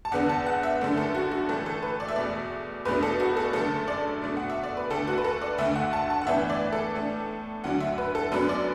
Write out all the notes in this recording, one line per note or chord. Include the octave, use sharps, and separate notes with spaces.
A5
E2 D3 B3 D4 F#5
A5
F#5
E5
F#2 D3 A3 D4
A4
F#4
F#4
A2 E3 A3 D4 A4
A4
B4
D5
E5
E2 B2 A3 D5
E2 B2 A3 D4 B4
A4
F#4
A4
F#2 D3 A3 A4
D5
B2 A3 D4
F#5
E5
D5
B4
D2 D3 A3 D4 A4
F#4
B4
A4
D5
D2 D3 A3 E5
F#5
A5
A5
F#5
A2 E3 B3 D4 E5
D5
A4
A2 A3 D4
D2 D3 F#3 D4 F#5
E5
B4
A4
F#2 F#3 B3 D4 B4
D5